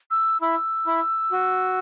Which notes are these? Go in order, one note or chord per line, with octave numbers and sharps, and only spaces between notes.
E6
E4 E6
E4
F#4